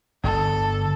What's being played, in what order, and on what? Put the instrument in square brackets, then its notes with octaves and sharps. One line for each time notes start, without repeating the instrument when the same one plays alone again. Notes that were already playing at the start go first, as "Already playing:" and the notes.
[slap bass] G1 D3 [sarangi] A4